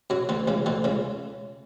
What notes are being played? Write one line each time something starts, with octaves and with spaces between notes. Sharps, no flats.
F#2 F#3
D2 D3
C#2 C#3
D2 D3
C#2 C#3